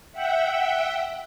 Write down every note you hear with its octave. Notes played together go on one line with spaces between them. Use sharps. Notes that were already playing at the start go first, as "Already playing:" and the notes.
E5 F#5 G5